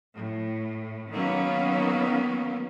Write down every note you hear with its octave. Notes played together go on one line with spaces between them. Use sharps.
A2
D#3 F#3 A#3 B3 C#4